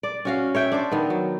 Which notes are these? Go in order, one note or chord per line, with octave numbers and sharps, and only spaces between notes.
D5
C#4 F#4 F5
C#5 E5 G5
D4 C5 D5
D#3 B3
F#3